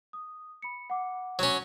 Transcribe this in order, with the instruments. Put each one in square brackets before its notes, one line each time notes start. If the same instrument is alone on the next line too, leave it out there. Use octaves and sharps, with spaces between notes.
[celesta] D#6
B5 C#7
F#5 D6
[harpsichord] F#3 C#4